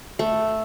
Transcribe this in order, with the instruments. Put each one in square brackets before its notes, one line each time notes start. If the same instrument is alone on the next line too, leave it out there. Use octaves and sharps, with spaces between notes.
[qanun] A3